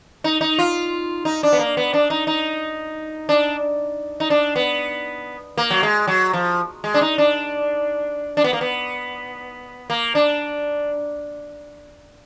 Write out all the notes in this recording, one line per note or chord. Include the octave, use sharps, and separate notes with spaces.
D#4
D#4
F4
D#4
D4
B3
A#3
B3
D4
D#4
D#4
D4
D#4
D4
B3
A#3
F#3
G#3
F#3
F3
G#3
D4
D#4
D4
D4
B3
A#3
B3
A#3
D4